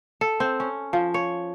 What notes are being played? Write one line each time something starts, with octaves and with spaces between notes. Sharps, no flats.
A4
C4
C#4
F3
C#5